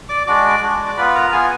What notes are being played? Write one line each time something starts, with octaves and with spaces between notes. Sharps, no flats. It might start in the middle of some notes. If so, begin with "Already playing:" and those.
D5 D6
G#3 D4 F#4 D5 D6
G#3 D4 F#4
D6
B3 F4 B4 B5
A#4 A#5
B3 F4 G#4 G#5